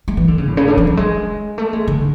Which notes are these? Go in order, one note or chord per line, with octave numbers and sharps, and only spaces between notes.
G#3
E3
D3
C#3
A2
C#3
D3
E3
F#3
G#3
A3
G#3
D3